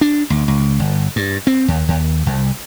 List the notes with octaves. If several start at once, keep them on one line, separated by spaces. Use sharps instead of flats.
D4
D2
C#2
G1
G2
C4
D#2
D#2
C2